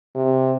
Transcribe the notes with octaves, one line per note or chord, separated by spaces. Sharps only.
C3